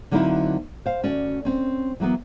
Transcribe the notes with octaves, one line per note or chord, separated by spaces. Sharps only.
D3 F#3 A#3 C4 D#4 E4
C5 F5
D2 C#4 F#4 D5
C4 C#4
E3 F#3 A#3 B3